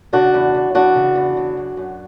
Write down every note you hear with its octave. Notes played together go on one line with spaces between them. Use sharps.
C#3 D4 F#4
E2
E2
E3 D4 F#4
C#3
E2
C#3
F#2
F#2